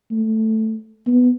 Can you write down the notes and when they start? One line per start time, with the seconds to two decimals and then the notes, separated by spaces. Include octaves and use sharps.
0.12 A3
1.07 B3